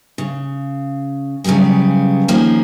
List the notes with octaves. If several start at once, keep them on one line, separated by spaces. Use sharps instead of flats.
C#3
C#3 F#3 G3 B3 G#4
D#3 F3 A#3 C#4 G#4